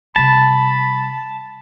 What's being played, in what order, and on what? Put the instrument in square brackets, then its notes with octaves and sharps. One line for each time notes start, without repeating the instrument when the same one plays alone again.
[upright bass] C3 G3 [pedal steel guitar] A5 [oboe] B5